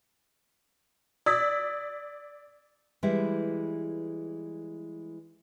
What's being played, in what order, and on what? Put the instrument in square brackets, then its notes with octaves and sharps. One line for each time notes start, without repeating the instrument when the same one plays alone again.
[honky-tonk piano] D5 B6 [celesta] D#6 E6 G#6
[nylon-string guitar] E3 G3 G#3 E4